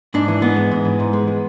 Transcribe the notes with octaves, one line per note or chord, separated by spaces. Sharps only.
G#2 D4
E3
G#2 B3
G#3
G#2
E3
G#2
G#3
G#3